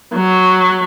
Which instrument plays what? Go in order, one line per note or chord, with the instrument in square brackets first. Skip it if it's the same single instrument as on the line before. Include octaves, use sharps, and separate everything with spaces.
[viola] F#3